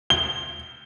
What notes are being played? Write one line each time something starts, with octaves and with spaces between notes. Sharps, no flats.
G7